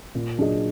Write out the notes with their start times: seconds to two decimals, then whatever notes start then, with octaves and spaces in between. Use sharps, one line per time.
0.15 A#2
0.38 F#3 D4 G#4 D#5